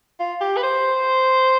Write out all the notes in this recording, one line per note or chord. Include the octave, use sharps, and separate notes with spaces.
F4
G4
B4
C5